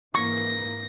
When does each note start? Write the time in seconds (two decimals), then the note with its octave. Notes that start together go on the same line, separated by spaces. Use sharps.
0.15 G#2 E3 A#3 C#6 A#6